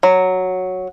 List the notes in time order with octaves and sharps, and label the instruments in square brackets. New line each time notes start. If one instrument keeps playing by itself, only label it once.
[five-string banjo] F#3